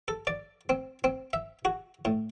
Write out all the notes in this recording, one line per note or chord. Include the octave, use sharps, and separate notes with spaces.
A4
D5
C4
C4
E5
F#4
A2